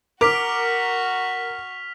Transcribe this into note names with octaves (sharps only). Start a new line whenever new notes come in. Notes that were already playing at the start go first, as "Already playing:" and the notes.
F#4 A#4 C#6 D6 F6 B6 F7